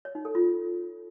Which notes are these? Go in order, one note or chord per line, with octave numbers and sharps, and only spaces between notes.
C#5
D#4
A4
F4